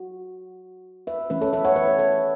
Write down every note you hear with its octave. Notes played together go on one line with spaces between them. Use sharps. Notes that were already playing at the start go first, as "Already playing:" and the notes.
Already playing: F#4
B4 E5
E3 A3 C#4 B4 E5
A4 C#5
B4 E5
C#5 F#5
B4 E5
A4 C#5